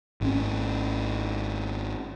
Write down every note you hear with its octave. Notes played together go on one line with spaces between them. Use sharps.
G#1 C#4